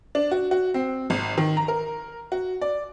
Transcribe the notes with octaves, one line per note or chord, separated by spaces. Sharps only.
D4
F#4
F#4
C4
G#1
D#3
A#5
A#4
F#4
D5